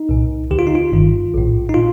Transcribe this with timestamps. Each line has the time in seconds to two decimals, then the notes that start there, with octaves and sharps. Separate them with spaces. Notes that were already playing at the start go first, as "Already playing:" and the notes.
Already playing: D#4
0.09 C2 A#2
0.51 D2 D3 G4
0.59 F4
0.67 D#4
0.75 F4
0.92 G1 G2 D#3
1.34 A#1 A2
1.69 D#4
1.74 A#2 F4